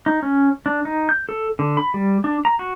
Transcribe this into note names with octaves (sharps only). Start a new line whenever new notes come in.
D#4
C#4
D4
D#4
G6
A4
D3
B5
G3
D4
A#5
F#4